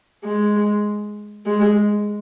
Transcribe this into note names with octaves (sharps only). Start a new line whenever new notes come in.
G#3
G#3